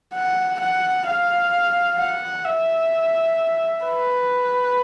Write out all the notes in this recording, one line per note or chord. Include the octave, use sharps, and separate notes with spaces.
F#5
F#5
F5
F#5
E5
B4